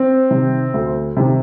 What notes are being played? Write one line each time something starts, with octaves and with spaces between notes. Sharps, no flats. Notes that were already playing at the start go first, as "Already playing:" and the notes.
Already playing: C4
C3 D#3
D2
C3 D#3